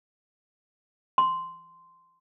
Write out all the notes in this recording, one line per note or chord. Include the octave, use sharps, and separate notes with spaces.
C6